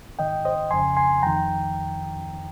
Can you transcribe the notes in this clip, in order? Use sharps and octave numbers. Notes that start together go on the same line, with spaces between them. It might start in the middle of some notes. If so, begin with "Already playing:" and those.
G#2 D#3 D#5 G5
C5 D#5
F2 C#3 G#5 C6
G#5 C6
F2 D#3 G5 A#5